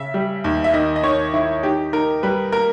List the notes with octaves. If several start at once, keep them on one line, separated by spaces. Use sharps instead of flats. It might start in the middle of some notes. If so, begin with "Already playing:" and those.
Already playing: C#3 E5
G3
D#2
E5
D#3 D#5
D#5
D#3 C#5
D#3 E4
D#4 G4
D#4 A#4
G3 B4
A#3 A#4